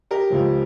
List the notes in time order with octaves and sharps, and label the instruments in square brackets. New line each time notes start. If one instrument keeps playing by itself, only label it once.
[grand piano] G4 A#4
C#2 C#3 F3